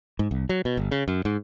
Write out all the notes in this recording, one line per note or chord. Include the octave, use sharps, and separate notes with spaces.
G#2
C2
F#3
B2
G1
C#3
F#2
G#2